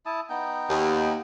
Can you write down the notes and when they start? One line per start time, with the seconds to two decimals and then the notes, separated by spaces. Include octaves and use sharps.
0.06 E4 A5 D#6
0.30 B3 D#4 G5
0.70 D#2